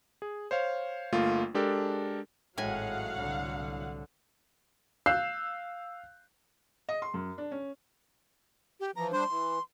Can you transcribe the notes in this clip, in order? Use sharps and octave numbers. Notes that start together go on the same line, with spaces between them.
G#4
C5 C#5 F5
G1 A3 A#3 F4
G#3 D4 G4 A4 A#4
G#1 A2 F#3 G#3 F5 F#5 G#5
C2 D3
F5 E6 F#6 G6 C7
D#5
C6
F#2
D4
C#4
G4
E3 F3 A#5
G3 D4 C5 C6
E3